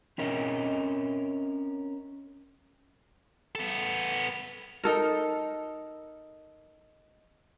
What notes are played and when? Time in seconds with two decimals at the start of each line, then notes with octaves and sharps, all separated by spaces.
0.18 C4 C#4 A#4 D#5
3.55 B3 A4
4.84 D#4 A4 A#4